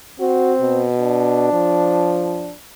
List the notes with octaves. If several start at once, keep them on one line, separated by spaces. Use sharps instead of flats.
C4 F#4
B2
D4
F3